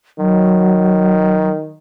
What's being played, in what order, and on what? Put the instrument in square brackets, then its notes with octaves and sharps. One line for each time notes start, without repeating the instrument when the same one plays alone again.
[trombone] D#3 [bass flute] F#3